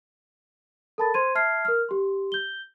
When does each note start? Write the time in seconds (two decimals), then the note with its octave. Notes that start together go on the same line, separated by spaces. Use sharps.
0.98 A4 A#4 A5 B5 A6
1.14 C5 C6 G#6 D#7
1.35 E5 A5 F6 G#6 C7
1.65 A#4 F6
1.89 G4 C6
2.32 G6 G7